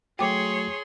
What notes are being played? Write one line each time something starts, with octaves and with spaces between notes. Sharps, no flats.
F#3 A3 F#4 G#4 C#5 G5 C6 D6